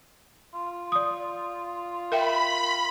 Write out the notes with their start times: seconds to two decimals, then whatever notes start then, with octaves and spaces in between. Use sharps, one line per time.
0.54 F4
0.92 D5 D#6
2.12 A#4 E5 G5 B5